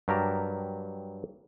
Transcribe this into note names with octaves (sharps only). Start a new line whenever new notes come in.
G2 F#3 G4 A#4 A5 A#5